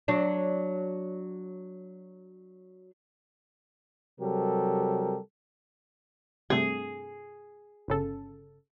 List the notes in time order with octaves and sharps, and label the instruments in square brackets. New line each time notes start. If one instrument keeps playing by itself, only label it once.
[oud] F#3 D4
[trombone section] C3 F#3 G3 G4 A4 A#4
[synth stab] G2 C3 A3 [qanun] G#4
[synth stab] G1 C#3 A4